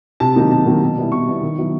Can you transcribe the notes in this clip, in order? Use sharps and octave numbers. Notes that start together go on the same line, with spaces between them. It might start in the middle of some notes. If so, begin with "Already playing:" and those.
C3 A5
D#3 F#3 A#3 D#4
C3 A5
D#3 F#3 A#3 D#4
B2
G3 B3 E4
B2 C#6
G3 B3 E4
D#3
F#3 B3 E4